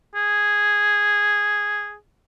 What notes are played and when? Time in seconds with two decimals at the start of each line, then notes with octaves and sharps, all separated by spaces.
0.15 G#4